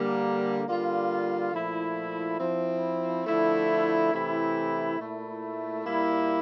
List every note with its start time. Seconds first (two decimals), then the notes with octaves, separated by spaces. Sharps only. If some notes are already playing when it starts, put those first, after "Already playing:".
Already playing: D3 G3 A#3
0.67 D3 G3 A#3 F4
1.52 A#2 F3 A3 E4
2.39 F3 C4 E4
3.26 D3 F3 A3 E4
4.12 C3 E3 A3 E4
4.99 A#2 A3 E4
5.85 A#2 G3 A#3 E4